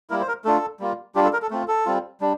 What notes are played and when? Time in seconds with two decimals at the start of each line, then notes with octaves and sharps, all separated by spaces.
0.10 G3 A#3 E4 A#4
0.21 C5
0.28 A#4
0.45 A3 D4 F4 A4
0.80 G3 A#3 F4
1.15 G3 D4 F4 G4
1.24 A4
1.33 A#4
1.42 A4
1.51 A3 C4 F4
1.68 A4
1.86 G3 C4 F4
2.21 G3 D4